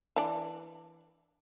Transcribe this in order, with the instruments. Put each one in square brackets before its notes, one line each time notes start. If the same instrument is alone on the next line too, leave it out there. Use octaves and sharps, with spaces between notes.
[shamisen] E3 D4